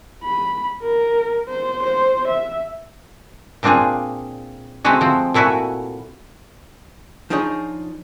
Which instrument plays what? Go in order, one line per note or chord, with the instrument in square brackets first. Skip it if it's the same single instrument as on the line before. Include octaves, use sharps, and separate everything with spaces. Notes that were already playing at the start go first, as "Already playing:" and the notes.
[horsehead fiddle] B5
A#4
C5
C5
E5
[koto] A#2 C4 D4 F4 G#4
G#3 A3 C4 E4 F#4 G#4
F3 C4
A#2 A3 E4 F#4 G#5
[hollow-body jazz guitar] F3 D4 D#4 G#4 C#5